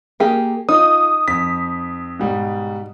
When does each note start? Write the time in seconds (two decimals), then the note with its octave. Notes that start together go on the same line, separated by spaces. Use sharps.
0.20 A#3 G4 G#4
0.69 D#4 F4 D#6
1.28 F2 B6
2.19 G#2 B2 G3